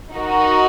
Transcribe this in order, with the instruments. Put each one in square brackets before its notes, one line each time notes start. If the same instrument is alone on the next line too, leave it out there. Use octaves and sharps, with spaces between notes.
[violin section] D#4 F#4 A#4